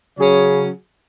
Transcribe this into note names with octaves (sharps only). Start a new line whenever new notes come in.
C#3 F#3 C#4 G#4 C#5